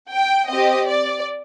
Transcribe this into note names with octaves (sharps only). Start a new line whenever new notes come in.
G5
C4 G4 D#5
D5